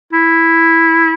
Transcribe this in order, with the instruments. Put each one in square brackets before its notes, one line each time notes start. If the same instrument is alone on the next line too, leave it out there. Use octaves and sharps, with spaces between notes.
[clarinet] E4